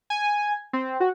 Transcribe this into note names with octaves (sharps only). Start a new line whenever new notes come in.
G#5
C4
F#4